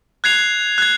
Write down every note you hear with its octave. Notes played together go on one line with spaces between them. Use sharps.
F#6 G#6 C7 F7
F#6 G#6